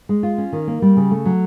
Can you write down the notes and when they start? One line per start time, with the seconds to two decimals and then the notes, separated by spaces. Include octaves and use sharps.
0.09 G#3
0.23 F4
0.38 C#4
0.53 D#3
0.67 A#3
0.82 G3
0.97 C#3
1.11 A3
1.25 F#3